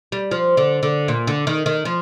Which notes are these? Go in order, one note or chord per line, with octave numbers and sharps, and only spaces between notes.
G3
F3
D3
D3
A#2
D3
D#3
D#3
F3